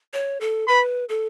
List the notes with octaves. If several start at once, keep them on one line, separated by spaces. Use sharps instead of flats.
C#5
A4
B4 B5
A4